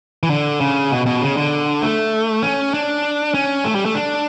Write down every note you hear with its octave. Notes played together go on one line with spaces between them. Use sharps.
E3
D3
C#3
B2
B2
C#3
D3
A3
C#4
D4
C#4
A3
G3
A3
D4